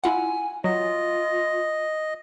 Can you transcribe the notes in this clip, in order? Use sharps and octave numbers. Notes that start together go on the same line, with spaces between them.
E4 F4 F#5 G#5
F#3 F4 D#5